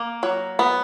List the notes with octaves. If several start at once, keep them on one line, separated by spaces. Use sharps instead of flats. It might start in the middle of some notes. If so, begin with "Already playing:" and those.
Already playing: A#3
F#3
B3